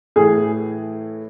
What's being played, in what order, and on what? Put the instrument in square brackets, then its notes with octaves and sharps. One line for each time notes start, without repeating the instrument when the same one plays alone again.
[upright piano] A2 E3 G#4